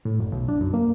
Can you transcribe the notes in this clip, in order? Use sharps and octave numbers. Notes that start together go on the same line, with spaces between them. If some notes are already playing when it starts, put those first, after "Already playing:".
A2
F#1
B1
D4
F#2
A#3